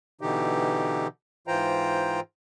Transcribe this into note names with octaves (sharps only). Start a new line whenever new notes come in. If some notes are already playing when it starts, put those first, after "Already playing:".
B2 D3 E3 D#4 G4
G#2 E3 F4 C5 G5 A#5